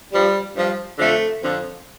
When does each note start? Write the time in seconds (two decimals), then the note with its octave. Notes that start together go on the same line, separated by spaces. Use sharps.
0.12 G2 F3 G3
0.55 G2 F3
0.98 F2 D3 F3 A3
1.41 F2 D3 F3